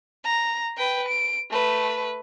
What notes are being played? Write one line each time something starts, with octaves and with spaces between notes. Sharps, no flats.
A#5
B4 G5
D7
A3 B4